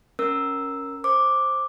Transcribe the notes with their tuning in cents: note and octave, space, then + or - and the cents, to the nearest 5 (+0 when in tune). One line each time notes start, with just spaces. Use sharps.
C#4 +0 A#4 +0 E6 +0
C5 +15 D6 +0